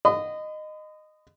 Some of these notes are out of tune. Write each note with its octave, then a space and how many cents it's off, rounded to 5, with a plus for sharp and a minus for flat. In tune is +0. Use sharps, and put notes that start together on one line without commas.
D#5 -15 B5 +45